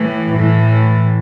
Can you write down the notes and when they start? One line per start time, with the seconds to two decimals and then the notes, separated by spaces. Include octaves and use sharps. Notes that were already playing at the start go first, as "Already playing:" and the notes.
Already playing: A2 E3
0.33 A2 E3